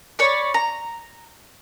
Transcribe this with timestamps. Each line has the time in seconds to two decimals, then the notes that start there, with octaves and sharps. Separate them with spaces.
0.19 C#5 D5 B5 C#6
0.54 A#5